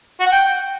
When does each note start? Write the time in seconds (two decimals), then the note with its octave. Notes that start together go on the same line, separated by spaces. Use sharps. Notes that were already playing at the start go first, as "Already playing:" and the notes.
0.20 F#4
0.26 F#5
0.32 G5